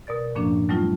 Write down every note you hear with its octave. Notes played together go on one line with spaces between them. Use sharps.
B2 A#4 D5 A6
F#2 A2 F3 A#3 C#4 D4
F#3 G3 A3 C#4 D#4 F4